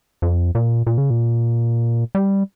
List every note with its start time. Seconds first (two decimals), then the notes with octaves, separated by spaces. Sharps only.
0.22 F2
0.55 A#2
0.87 A#2
0.98 C#3
1.10 A#2
2.15 G3